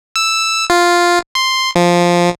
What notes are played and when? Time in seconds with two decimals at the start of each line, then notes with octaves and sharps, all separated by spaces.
0.16 E6
0.70 F4
1.35 C6
1.76 F3